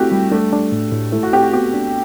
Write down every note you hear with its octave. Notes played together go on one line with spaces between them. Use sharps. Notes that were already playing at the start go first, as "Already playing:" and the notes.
Already playing: A3 C4 E4 F#4 G4
G3
A3 D4
D4
A2
A2
A3 E4
F#4
C4 G4
F#4
B3 G4
D4